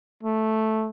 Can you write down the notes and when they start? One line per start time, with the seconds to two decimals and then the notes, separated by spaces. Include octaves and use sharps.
0.23 A3